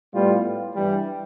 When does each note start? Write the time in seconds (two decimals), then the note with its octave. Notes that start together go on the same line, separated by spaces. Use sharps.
0.13 A2 G3 B3 F4
0.74 G2 E3 G3